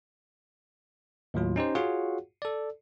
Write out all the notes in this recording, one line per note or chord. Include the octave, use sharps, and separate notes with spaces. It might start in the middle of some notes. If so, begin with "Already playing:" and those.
D#2 A2 F#3 F4
C#4 D#4 G4 C5
F4 F#4 G#4 C#5 F5 F#5
A4 D5